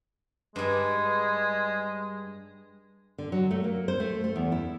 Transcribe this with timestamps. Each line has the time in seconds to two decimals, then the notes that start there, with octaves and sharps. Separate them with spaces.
0.56 G2 G3 G#3
3.18 D3
3.32 F#3
3.51 A3
3.64 A#3
3.88 C5
4.00 A3
4.24 A3
4.36 E2
4.52 E4